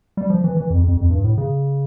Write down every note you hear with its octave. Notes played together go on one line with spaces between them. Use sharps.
G3
F3
E3
E3
F2
F2
F2
G2
A2
C#3